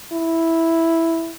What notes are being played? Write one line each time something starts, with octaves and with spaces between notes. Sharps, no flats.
E4